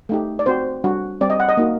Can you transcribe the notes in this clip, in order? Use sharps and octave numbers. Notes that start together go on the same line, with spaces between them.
A3 D#4 G4
D5
C4 F#4 C5
G3 D4 F#4
G3 C4 G4 D5
D#5
F#5
D#5
A#3 D#4 F#4